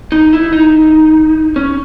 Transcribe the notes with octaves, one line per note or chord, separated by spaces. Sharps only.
D#4
E4
D#4
C#4